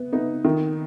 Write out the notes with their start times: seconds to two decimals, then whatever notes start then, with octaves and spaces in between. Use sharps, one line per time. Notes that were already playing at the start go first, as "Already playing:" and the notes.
Already playing: B3
0.13 B3 D#4
0.45 D#3